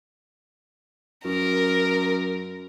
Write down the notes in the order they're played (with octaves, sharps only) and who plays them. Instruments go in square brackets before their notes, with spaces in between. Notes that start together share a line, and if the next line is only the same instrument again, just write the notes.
[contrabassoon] F#2 [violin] A#4